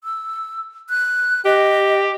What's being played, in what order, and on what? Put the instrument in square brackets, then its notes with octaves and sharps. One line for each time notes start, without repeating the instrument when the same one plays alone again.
[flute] E6
F#6
[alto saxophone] G4 [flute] D#5